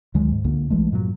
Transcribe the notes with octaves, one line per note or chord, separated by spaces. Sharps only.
D2 D#3 F#3 G#3
G#2
C#2 D3 A#3
B1 E3 G#3 A3
G2 A#2 D#3 F#3